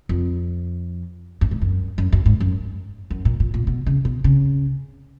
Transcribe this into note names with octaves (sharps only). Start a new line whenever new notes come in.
F2
F#2
G#2
F#2
F#2
F#2
G#2
F#2
F#2
A#2
A#2
A#2
B2
C#3
B2
C#3